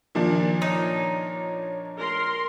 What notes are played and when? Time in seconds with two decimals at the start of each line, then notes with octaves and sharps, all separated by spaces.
0.15 A#2 D#3 F3 D4
0.62 D#4 C#5
1.99 A#4 C6